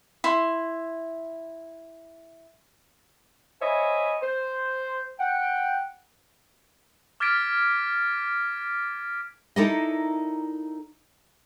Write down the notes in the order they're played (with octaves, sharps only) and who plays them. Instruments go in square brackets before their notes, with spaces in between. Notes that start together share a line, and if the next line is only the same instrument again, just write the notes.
[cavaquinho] E4 C6
[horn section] C5 C#5 D#5 E5 G#5 B5
C5
F#5 G5
[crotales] D6 F6 G#6 A6 B6 D7
[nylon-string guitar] D#4 E4 A4 A#4 D5 D#5